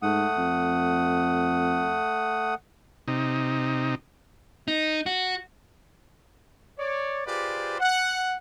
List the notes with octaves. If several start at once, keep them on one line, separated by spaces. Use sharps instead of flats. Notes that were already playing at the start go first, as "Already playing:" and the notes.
G#2 A3 F#5 D#6
F2
C3 D#4
D#4
F#4
C#5 D5
F4 G4 G#4 B4 C5 D5
F#5